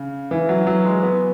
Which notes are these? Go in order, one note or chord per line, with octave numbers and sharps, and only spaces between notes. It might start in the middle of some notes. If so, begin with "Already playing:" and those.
Already playing: C#3
E3
F#3
F#3
G#3
B3